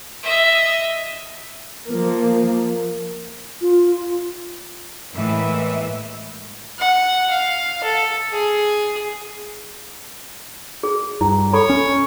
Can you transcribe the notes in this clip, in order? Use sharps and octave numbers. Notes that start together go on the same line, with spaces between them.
D#5 E5
F3 A#3
F4
A2 E3 G#3 A#3 B4 E5
F#5
F5
A4
G#4
G#4
G2 E4
A4 C#5 B5
C#4